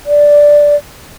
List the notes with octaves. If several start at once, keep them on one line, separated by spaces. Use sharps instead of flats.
D5